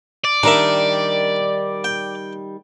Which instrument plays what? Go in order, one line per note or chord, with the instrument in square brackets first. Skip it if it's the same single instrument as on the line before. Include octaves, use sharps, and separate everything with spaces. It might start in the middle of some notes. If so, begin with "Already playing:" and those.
[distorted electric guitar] D5
[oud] D#3 G3 [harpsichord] D4 A#4 E5
[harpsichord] G5